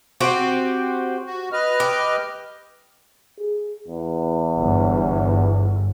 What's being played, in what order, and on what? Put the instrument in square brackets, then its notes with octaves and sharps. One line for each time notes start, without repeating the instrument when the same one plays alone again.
[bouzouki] C4 F#4 G4
[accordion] F#4
B4 D#5 F6
[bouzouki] G4
[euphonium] G#4
E2
[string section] G1